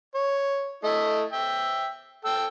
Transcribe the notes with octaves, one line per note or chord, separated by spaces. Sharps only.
C#5
A3 E4 D#5
E5 G5
A4 G5 E6